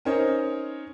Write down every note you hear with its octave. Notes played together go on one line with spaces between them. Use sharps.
C#4 D#4 A#4 C5 C#5 D#5